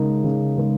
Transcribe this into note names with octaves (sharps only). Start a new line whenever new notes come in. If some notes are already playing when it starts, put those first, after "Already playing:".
Already playing: C#3 G#3 D#4 A#4
C#3
G#3 D#4 A#4